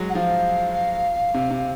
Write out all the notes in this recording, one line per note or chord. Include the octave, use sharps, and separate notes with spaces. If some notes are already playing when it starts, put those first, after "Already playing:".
Already playing: F#3 G#3
F#5
F3 F5
C3
C3